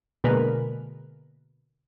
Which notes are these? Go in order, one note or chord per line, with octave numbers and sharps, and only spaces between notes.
B2 D3 G#3 A#3 A#4 B4